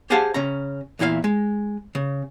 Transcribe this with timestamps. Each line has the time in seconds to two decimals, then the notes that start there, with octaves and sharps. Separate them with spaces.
0.10 G4 G#4 C5 F5 F#5 A5
0.34 C#3 C#4 A#5
0.99 E2 A#2 E4 F#4 F5
1.24 G#3
1.95 C#3